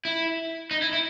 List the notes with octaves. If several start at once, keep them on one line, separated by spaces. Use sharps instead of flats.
E4
D#4
E4
E4